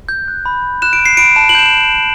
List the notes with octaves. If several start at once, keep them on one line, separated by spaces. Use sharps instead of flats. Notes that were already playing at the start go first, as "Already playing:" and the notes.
G6
F#6
B5
B5
F#6 E7
D7
F#6
C7
B5 D7
A5 E7
F#7
G6 E7